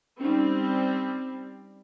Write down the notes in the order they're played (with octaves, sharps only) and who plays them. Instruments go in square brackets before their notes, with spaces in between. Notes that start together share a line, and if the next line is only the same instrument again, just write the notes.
[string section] G3 C4 [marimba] C#4 D#4